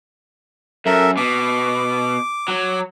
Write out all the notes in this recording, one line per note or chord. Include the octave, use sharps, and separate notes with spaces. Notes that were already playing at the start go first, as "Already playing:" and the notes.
F#2 A4 A#4 E5
B2 D6
F#3